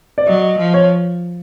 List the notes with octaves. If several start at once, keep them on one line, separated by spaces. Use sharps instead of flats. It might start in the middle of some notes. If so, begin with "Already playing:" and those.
D5
F#3 D#5
F3
C#5